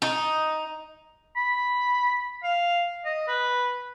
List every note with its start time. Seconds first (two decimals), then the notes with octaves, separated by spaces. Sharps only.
0.02 D#4
1.36 B5
2.43 F5
3.05 D#5
3.28 B4